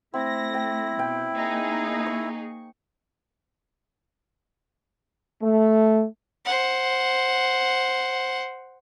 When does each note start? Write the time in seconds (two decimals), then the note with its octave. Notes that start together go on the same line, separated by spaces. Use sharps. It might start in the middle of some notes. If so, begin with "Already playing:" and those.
0.14 A3 C4 E4 A#6
0.54 G5
0.99 B2 G5
1.35 A#3 D#4 G#4
2.06 C#6
5.42 A3
6.45 C5 F#5